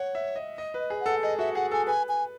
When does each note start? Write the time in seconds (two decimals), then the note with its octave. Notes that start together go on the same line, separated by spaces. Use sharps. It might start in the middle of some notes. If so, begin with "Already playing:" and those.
Already playing: C#5 F#5
0.15 E5
0.36 D#5
0.58 D#5
0.74 B4
0.80 D#5
0.90 G#4
1.00 F#5
1.06 A4
1.23 G#4 D#5
1.39 F#4 E5
1.55 G#4 F#5
1.72 A4 G#5
1.87 B4 G#5
2.09 G#5